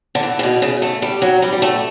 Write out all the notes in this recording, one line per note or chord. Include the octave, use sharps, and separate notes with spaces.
D3
E3
C#3
B2
C#3
A3
G3
F#3
G3
G3
A3